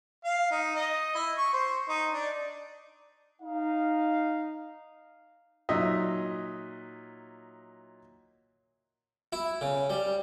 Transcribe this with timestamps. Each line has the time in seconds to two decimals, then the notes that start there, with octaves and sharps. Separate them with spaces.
0.24 F5
0.51 D#4
0.76 D#5
1.15 E4
1.37 C#6
1.53 C5
1.89 D#4
2.11 D4
3.42 D#4 F5
5.69 A#2 F#3 D#4 D#5 E5
9.33 E4
9.61 C#3
9.90 G3